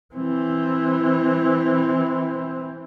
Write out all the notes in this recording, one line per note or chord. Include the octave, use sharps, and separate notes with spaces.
E3 C4